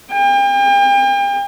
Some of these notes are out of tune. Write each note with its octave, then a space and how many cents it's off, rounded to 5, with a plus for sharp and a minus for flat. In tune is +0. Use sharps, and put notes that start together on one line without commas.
G5 +40